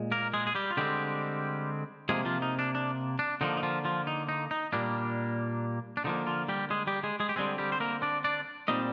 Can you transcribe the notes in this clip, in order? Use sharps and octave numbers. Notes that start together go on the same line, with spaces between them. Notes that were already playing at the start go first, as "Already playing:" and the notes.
Already playing: A#2 G#3
A#3 A#4
G#3 G#4
G#4
G3 G4
F4
D3 G3 G#3 C4 G4
C3 F3 G#3 A#3 G#4
F3 F4
D#4
D4
D4
D4
D3 F3 A#3 D#4
D#4
F3 F4
F3 F4
D#4
D#4
D#4
A#2 G3 A#3 D4
D4
D3 F3 A#3 D#4
F3 F4
G3 G4
G#3 G#4
G3 G4
G#3 G#4
G#3 G#4
G4
D3 G3 G#3 C4 G#4
G3 G4
C5
A#3 A#4
D4 D5
D4 D5
A#2 G3 C4 D#4 D#5